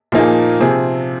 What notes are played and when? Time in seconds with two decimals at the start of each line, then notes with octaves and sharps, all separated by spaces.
0.12 A#2 F3 A#3 D#4 G#4
0.60 C3 F3 C4 G#4